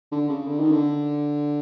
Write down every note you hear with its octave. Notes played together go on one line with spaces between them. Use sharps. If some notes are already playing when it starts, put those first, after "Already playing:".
D3
C#3
D3
D#3
D3